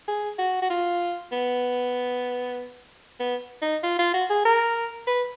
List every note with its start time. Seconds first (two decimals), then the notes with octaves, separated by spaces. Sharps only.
0.08 G#4
0.38 F#4
0.62 F#4
0.70 F4
1.32 B3
3.20 B3
3.62 D#4
3.83 F4
3.99 F4
4.13 F#4
4.30 G#4
4.45 A#4
5.07 B4